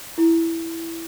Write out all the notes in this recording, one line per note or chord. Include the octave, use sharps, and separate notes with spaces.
E4